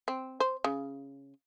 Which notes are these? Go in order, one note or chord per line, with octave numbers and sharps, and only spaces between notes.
C4
C5
C#3